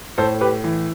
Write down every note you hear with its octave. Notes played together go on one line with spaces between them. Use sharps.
A2 A4 C5
G4 B4
E3